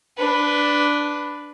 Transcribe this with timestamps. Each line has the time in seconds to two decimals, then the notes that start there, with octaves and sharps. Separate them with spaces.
0.18 D4 B4